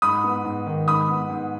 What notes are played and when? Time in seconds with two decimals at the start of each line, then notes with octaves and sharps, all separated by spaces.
0.02 G#2 B5 D#6
0.24 B3
0.44 G#2
0.66 D#3
0.88 G#2 B5 D#6
1.08 B3
1.30 G#2